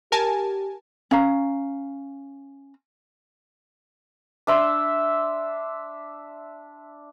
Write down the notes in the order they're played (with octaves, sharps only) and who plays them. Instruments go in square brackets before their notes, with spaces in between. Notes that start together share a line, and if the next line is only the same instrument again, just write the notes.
[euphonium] G4 [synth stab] A#4 G#5 A5
[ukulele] C#4 F5 A#5
[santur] D4 E5 C6